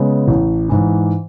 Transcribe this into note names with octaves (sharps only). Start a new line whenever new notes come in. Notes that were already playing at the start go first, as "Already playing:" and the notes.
Already playing: C#3 G#3 B3
A1
G#2 E3